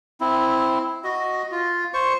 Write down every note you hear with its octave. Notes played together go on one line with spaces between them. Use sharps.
C4 E4
F#4 D#5
F4
C5 C#6